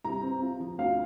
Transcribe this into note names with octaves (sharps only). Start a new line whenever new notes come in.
C2 A#5
C4
F4
F3
D2 F5